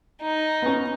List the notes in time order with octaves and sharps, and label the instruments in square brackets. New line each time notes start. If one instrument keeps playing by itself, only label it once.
[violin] D#4
[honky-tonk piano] B3 C#4